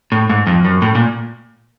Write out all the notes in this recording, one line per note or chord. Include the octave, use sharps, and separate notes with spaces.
A2
G#2
F2
F#2
A2
A#2